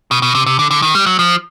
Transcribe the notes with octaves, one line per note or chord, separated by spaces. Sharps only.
B2
B2
C3
C3
D3
D3
D#3
G3
F#3
F3